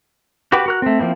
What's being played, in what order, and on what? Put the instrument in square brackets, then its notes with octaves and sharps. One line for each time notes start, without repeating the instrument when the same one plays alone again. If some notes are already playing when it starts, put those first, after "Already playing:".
[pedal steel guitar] F#4 G4 B4 D6
F#4 A#4 F#6
A3 C4
F3 A#3 C4 E4